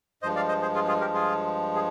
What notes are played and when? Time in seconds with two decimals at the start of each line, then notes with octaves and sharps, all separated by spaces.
0.22 G2 F3 G#3 C5 D#5
0.36 D5 F5
0.48 C5 D#5
0.62 G#4 C5
0.75 F4 G#4
0.88 F4 G#4
1.00 G4 A#4
1.14 F4 G#4
1.75 G#4